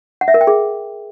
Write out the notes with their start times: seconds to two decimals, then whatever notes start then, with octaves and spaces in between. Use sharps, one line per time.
0.21 F#5
0.28 E5
0.34 A#4
0.41 G5
0.47 G#4